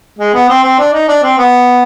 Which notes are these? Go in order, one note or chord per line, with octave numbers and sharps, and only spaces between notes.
G#3
B3
C4
C4
D4
D#4
D4
C4
B3